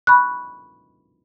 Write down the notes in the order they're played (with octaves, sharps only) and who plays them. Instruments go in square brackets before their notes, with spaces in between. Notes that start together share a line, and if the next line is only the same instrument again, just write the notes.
[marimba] B5 C#6 F#6